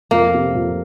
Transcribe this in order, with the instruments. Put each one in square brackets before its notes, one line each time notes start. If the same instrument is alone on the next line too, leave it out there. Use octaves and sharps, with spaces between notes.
[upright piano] F2 [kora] A#3
[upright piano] C3
F2